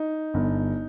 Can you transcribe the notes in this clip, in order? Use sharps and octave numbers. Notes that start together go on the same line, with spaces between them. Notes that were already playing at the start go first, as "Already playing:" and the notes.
Already playing: D#4
G1